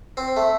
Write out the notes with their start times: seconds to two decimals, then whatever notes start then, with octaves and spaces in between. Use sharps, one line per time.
0.17 C4
0.36 A3